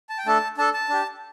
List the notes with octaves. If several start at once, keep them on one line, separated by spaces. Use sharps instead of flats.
A5
G5
A3 D4 A4 A5
D4 A4 A5
A5
D4 G4